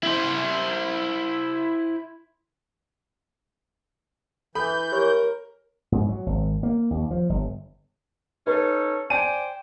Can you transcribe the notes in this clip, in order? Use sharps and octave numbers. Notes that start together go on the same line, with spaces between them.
E4 C5
E3 A4 B5 G6
G4 A#4 C#5 C#6
G#2
F#3
G#1
A#3
D#2
F3
G1
C#4 D#4 A4 B4
C5 D5 G5 G#5 D#7